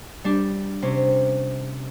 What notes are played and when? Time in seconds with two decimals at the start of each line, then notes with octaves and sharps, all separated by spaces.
0.24 G3 D4 G4
0.82 C3 C#4